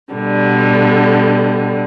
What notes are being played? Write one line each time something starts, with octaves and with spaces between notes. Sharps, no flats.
B2 D3 G3